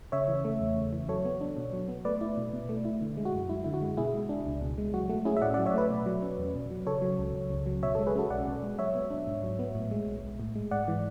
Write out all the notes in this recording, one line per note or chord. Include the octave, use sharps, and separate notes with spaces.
C#3 C#5 E5
E3
A3
E2
C#3
E3
F#3 A4 C#5
B3
D4
B2
F#3
B3
A3 B4 D5
E4
B2
B2
A3
E4
D3
G#3
F#4
F#2
F#2 E4
D3 E4
F#4
G#3
B2 E4 G#4
G#3
D4
C#2
B2
G#3
F#3 F#4
A3 F#4
C#4 E4 G#4
E5
A2 D5 F#5
D5 F#5
F#3
C#5 E5
A3 B4 D5
B2
F#3
C#4
E2
B2
F#3
C#3 A4 C#5
F#3
C#2
C#2
C#3
F#3
B2 C#5 E5
A4 C#5
G#3
G#4 B4
C#4 F#4 A4
B1 D5 F#5
B2
G#3
F#3 C#5 E5
B3
D4
G#2
F#3
B3
A2
G#3
B1
B1
A2
G#3
G#2 D5 F#5
E3